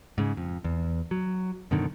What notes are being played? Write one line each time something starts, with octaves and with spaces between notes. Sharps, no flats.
G#2 C#3
F2
E2
F#3
F#2 B2 D3 D#3